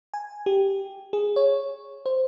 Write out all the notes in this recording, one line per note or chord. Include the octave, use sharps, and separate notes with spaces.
G#5
G4
G#4
C#5
C5